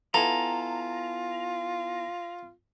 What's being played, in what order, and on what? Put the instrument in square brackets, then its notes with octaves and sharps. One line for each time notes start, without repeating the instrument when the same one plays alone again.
[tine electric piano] B3 E4 G#5 [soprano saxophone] F4 [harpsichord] A4 [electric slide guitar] A#5